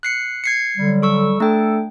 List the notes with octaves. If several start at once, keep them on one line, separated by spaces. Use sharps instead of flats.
F#6 C7 C#7
G#6 C7 C#7
D3 F#3 G3
A4 C#6 E6
A3 D4 A4 G5